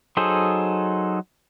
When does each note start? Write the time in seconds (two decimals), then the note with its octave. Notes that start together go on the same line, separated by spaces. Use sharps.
0.17 F#3 D#4 G#4 A4 C5